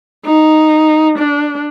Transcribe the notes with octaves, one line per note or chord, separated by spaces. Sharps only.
D#4
D4